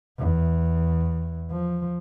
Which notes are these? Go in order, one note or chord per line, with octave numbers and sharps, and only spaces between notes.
E2
F3